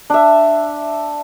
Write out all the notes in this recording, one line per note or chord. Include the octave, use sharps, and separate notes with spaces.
D4 E5